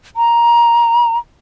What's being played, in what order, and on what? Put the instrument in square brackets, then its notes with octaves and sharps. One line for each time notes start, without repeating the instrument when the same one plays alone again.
[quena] A#5